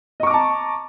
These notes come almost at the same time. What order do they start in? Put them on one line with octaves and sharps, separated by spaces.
D#5 C#6 D6 A#5 A5